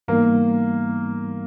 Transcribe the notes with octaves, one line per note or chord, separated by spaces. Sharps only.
G#2 E3 G3 A#3 B3 D#4